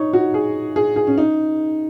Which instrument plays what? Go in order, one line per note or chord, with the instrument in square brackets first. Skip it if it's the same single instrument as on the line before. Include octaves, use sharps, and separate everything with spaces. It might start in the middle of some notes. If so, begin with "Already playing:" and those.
Already playing: [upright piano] D#4 C#5
F#4
G#4
G#4
G#4
C#4
D#4